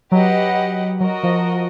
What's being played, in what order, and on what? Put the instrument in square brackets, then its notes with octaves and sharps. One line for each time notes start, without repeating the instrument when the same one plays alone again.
[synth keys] F#3 [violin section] G4 B4 D#5 F#5
[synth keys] F#3 [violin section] F#4 A#4 D#5
[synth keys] F3